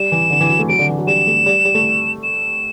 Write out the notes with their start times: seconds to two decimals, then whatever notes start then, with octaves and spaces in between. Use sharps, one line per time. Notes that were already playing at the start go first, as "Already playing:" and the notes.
Already playing: G3 E7
0.12 E3
0.30 D3
0.41 E3
0.50 F#3
0.59 A3
0.69 F#3 D7
0.79 D3
0.88 E3
0.98 F#3
1.07 G3 E7
1.27 A3
1.46 G3
1.65 G3
1.75 A3
2.23 E7